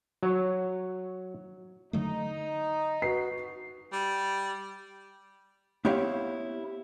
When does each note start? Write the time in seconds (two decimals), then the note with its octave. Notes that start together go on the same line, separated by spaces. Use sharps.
0.23 F#3 C#5
1.93 D3 F#3 A3 D#4
3.02 F#4 B4 C7
3.92 G3
5.85 B3 C4 E4 G4 C#5 F5